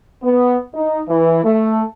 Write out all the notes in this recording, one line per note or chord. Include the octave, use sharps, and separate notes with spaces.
B3
D#4
E3
A3